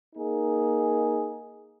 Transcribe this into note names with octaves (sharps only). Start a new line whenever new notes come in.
A#3 D#4 G#4